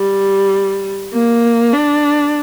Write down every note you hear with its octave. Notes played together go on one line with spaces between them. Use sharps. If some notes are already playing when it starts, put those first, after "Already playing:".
Already playing: G3
A#3
D4